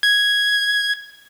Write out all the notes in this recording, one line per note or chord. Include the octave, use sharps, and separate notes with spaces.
G#6